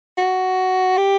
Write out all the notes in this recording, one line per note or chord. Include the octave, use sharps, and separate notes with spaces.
F#4
G4